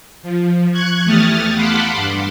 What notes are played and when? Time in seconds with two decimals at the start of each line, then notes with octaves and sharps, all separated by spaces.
0.23 F3
0.71 C#6 F#6 G#6
1.04 E2 A3 G4 D#6 F6 A6
1.55 F5 F#5 A5 B5 C6 D6
1.94 G2